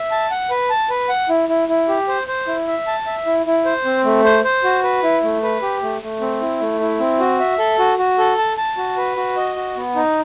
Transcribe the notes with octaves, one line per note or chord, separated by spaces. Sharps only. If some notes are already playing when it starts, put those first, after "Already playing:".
Already playing: E5
A5
F#5
B4
A5
B4
F#5
E4
E4
E4
G4
C5
C5
E4
E5
A5
E5
E4
E4
C5
C4
A3
C5
C5
F#4
B4
E4
A3
B4
G4
A3
A3
C4
E4
A3
E4
C4
F#4
E5
A4
F#4
F#4
A4
A5
A5
F#4
B4
F#4
D#5
F#4
B3
D#4